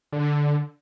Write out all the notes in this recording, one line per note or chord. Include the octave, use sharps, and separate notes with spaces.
D3